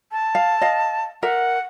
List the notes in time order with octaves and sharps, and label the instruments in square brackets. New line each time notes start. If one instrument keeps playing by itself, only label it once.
[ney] A5
[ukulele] F5
D#5 F5
[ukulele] A#4 E5 [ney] F#5